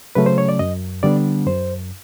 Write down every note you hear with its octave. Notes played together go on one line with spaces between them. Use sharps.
C#3 F#3 A3 C#4 B4
C5
C#5
D5
F#2 D#5
D3 G3 B3 D4 D5
F#2 C5